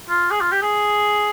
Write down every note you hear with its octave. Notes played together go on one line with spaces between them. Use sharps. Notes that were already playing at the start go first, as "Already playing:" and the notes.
F4
G#4
F4
G4
G#4